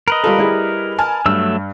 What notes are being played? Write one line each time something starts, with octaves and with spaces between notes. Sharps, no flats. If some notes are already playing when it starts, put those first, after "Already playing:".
A#4 B4 D#5
G3 F4 A4
G3 E4 G#4
G#5 A5 F6
G2 F#3 A3 E6